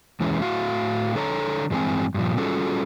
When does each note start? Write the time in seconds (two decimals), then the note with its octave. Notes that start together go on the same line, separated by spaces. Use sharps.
0.20 E2 E3 G#3 C#4
0.42 A2 F#4 F5
1.15 D3 A4 C#5 A#5
1.71 G2 E3 G#3 C4 G#5
2.14 G2 A#2 F3
2.37 G3 C#4 F4 F#4 G#4 A4